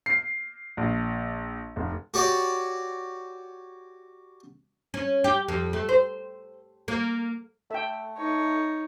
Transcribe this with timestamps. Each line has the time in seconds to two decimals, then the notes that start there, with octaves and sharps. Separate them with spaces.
0.06 C7
0.77 A#1
1.76 F1
2.14 F#4 G4 C#5 D5
4.94 C#4
5.24 G4
5.48 F2
5.73 A3
5.89 C5
6.88 A#3
7.71 A3 E5 G5
8.17 D#4 C#5